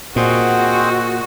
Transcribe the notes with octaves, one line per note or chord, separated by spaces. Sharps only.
A#2 C4 F#4 G#4 C5 D#5 F#5 C6